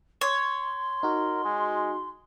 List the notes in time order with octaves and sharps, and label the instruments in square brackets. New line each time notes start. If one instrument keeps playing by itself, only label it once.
[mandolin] C#5 [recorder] C6
[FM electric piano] D#4 F#4 [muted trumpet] A#4
[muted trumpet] G#3